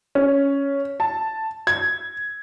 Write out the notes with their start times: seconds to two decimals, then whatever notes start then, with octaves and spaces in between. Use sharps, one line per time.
0.15 C#4
1.00 A5
1.67 G#6